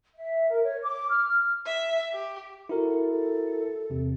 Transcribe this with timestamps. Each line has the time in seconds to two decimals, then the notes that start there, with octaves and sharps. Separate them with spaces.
0.16 E5
0.50 A#4
0.63 C#5
0.83 D6
1.09 F6
1.66 E5
2.12 G4
2.69 E4 F#4 A4 A#4
3.11 A4
3.90 E2 C3